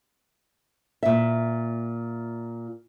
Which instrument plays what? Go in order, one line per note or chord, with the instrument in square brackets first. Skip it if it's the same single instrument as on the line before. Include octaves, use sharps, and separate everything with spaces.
[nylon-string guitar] A#2 E5